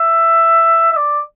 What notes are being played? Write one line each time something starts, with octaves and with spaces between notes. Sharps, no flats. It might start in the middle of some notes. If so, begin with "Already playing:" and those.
Already playing: E5
E5
D5